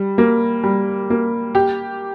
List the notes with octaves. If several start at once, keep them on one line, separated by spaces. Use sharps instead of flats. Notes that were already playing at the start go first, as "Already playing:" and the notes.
Already playing: G3
A#3
G3
A#3
G4